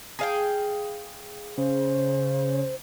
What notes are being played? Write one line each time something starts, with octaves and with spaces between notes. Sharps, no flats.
G#4 F5 G5
C#3 C5